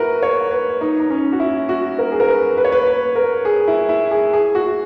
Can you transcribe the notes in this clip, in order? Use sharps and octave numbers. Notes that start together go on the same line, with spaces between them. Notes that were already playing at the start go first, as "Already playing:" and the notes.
Already playing: E4 F#4 A#4 B4
C#5
B4
D#4
D#4
C#4
F#4
E4
F#4
A#4
G#4
A#4
B4
B4
C#5
B4
B4
A#4
G#4
E4
E4
G#4
G#4
F#4